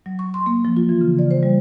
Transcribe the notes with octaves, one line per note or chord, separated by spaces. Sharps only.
F#3
C#6
C6
A#3
F3
F4
E3
C#3
D5
C5
G3